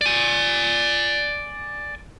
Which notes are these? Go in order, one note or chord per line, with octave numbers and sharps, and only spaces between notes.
D5 G#5